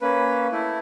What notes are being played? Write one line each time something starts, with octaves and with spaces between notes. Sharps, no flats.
A#3 C#4 B4
A3 E4